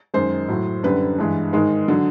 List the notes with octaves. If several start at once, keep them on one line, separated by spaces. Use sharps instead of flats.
F#2 D#3 G#3 C5
A2 F#3
F#2 D3 G3 B4
G2 E3 G#3
G#2 D#3 G#3
D3 F#3